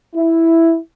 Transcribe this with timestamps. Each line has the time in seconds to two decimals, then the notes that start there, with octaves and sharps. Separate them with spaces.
0.15 E4